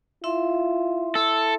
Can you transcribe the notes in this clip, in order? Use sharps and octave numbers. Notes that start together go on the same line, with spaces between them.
E4 F4 E5 C6
A4